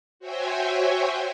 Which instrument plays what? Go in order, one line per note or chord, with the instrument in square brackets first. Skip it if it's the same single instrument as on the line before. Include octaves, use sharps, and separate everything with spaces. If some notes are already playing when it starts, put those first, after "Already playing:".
[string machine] F#4 C5 C#5 E5 G5 G#5